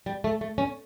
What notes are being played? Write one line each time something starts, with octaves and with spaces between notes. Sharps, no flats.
G3
A3
A3
C#4